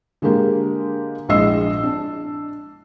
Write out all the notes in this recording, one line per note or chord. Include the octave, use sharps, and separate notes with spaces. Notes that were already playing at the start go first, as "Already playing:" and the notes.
D3 G#3 A#3 G4 A#4
A#1 G#3 E4 D#5 E6 C7
D4